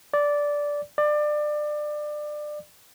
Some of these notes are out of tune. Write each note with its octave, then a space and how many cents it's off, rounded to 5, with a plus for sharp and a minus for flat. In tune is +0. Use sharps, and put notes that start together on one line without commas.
D5 -10
D5 +25